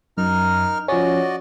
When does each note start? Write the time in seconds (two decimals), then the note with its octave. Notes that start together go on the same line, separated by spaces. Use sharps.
0.18 F#2 D#4 A#4 F6
0.88 F3 C#4 F#4 D5 D#5